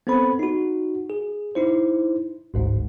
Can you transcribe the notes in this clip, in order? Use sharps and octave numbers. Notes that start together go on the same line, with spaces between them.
B3 C4 A4 C5 B5
D#4 F#4
G#4
D#4 E4 C5
G#1 D2 G#2